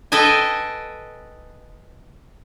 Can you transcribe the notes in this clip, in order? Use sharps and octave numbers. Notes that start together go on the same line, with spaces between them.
A4 B4 D#5 G5 G#5